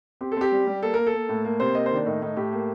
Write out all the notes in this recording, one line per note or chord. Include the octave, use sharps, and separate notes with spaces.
C4 G4
A4
C4 G4
G3
G3
A#3 A4
A#3 A#4
A4
A#3
A2
A#3
C3 C5
A#3 D#5
C5
D#3 D4
A2 D#4
A2 D#4
A2 G4
A#3